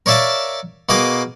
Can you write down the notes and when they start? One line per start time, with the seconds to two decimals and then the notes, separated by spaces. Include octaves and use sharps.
0.06 A#4 C#5 D5 E5 F5 A5
0.89 B2 A#3 G#4 A#4 D6 D#6